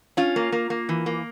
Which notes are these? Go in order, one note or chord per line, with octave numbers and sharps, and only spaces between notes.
C#4 F4
A#3
A#3
A#3
E3
A#3